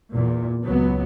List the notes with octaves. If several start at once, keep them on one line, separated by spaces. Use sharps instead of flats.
E2 A#2
C#2 F#3 B3